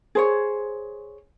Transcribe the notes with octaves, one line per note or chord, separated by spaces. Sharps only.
G#4 C5 C#5